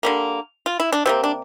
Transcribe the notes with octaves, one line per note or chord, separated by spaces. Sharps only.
D3 G3 A#3
F4
E4
D4
C3 G3 A#3 C4
D4